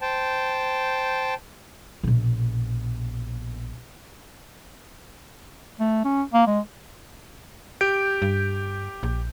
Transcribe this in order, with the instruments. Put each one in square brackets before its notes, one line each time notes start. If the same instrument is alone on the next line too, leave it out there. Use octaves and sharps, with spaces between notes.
[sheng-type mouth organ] C5 G5 A5
[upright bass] A#1 B2
[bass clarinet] A3
C#4
A#3
G#3
[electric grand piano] G4 G6 D7
[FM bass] G2
A#1